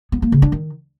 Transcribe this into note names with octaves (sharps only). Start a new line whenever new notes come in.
B3
A#3
C#3
D4
D#3